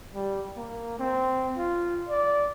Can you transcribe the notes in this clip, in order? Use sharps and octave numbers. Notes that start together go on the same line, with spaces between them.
G3
A#3
C4
F4
D5